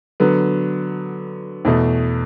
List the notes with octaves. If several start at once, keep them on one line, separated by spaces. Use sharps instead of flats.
D3 F#3 B3
E2 B2 A3